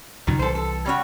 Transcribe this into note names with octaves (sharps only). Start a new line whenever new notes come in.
C#2 F#2 A#2 D#3
C2 E3 A4 C5
A4
G3 C#4 F#4